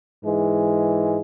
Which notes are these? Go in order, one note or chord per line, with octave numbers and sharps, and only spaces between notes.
G#2 E3 G#3